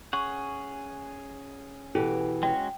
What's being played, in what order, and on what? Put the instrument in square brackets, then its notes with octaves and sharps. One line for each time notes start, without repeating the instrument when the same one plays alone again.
[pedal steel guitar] C#4 G#4 F#5 [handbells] C#6
[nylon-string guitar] B2 E3 G4 [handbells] E4 A4
[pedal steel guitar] G#3 C#4 F#4 [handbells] G5